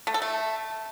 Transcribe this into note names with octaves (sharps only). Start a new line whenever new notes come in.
A3
A4
A3